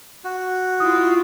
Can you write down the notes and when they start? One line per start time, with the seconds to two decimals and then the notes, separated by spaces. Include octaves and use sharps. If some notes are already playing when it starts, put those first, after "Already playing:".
0.24 F#4
0.80 E4 F4 D#6